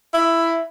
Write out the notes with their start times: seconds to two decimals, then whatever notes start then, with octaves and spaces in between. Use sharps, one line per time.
0.14 E4